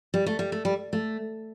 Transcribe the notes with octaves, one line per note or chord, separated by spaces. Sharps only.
G3
A3
G3
A3
G3
A3